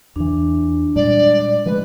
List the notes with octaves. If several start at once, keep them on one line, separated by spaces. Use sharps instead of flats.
E2 E3 D4
A#2 G3 G#3 D5
F3 G#3 A3 B4